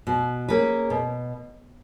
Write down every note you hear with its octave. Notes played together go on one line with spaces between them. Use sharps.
B2
A#3 C#4 G#4 B4
B2